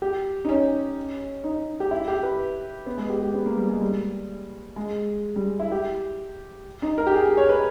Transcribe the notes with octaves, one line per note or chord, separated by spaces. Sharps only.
G4
D#4
C#4
D#4
G4
E4
G4
B4
B3
G#3
G4
G4
B3
A#3
G3
G#3
G3
G#3
G3
E4
G4
D#4
A#4
G4
G#4
G#4
C#5
B4